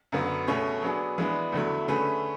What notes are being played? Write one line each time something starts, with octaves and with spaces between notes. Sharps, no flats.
F#2 D3 F#3 B3
B2 A3 C#4 G#4 C#5
F#3 B3 D4 G#4
E3 G#3 B3 D4
E2 D3 F#3 A3 E4
D3 A3 C#4 G#4 B4